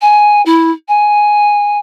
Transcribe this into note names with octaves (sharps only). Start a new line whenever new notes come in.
G#5
E4
G#5